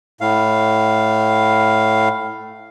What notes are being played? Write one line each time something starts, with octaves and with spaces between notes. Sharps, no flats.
A2 F5